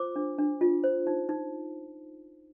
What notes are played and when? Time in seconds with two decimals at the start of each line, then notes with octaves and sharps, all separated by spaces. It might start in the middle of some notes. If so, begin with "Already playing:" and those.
Already playing: F4 C5 D6
0.16 D4
0.38 D4
0.61 F4
0.84 C5
1.07 D#4
1.29 D#4